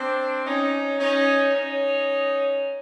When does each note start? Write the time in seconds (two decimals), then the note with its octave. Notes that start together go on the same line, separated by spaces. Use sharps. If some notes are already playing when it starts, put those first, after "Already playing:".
Already playing: C4 D4
0.46 C#4 D#4
1.00 C#4 D#4
1.54 C#4 D#4